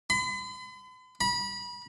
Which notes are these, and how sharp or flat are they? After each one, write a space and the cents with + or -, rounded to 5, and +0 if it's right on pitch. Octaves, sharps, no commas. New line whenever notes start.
B5 +45
B5 -30